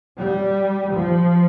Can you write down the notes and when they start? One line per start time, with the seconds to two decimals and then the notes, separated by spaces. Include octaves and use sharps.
0.17 G3
0.93 F3